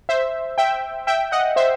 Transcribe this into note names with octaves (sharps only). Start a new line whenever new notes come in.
C5 E5
E5 G5
E5 G5
D#5 F#5
C5 E5